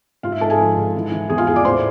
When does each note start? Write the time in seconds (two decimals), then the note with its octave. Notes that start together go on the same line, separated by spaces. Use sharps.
0.23 G#2 F4 F5
0.32 E5
0.41 G#2 A4 A5
0.50 G#4 G#5
0.60 F3
0.77 G#2
0.95 E3
1.12 E3
1.30 E2 G#4 G#5
1.38 F4 F5
1.47 E3 G#4 G#5
1.56 D5 D6
1.65 A2 C5 C6